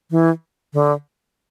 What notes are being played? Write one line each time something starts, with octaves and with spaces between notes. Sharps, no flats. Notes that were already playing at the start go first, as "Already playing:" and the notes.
E3
D3